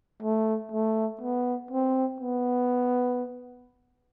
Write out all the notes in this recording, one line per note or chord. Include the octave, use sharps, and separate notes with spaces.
A3
A3
B3
C4
B3